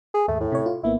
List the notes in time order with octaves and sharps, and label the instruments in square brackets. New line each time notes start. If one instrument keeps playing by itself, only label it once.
[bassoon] G#4
[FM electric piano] D#2 G#2 [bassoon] A3
[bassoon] A2
[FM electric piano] C3 C#5
F4
[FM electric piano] G#1 A#3 B3 [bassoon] E4